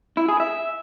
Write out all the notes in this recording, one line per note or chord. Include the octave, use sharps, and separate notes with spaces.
E4
G#4
E5